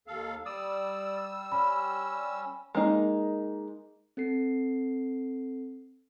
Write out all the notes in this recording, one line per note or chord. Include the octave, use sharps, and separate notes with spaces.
D#2 A4 F5
G3 D5 D#6 E6
C#4 B5
G#3 A#3 D#4
C4 A4 C7